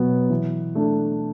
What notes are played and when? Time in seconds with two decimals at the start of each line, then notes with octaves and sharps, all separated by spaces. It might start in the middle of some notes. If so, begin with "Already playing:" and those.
Already playing: B2 F#3 B3
0.30 E3
0.75 A3 D4